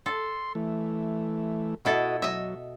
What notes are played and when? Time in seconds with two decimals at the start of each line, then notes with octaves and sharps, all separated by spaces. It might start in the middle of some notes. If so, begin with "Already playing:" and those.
0.06 A4 C6
0.55 E3 A3
1.85 B2 E4 F#4 A4 D#5
2.22 F#3 D#5 E5